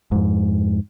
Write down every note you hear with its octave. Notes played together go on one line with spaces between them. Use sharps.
F2 G#2